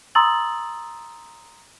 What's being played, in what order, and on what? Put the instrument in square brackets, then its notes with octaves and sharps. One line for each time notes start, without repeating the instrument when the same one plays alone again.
[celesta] A#5 C6 D#6 E6 A6 F#7